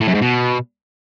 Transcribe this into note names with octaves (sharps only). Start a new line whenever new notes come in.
A2
F#2
G#2
B2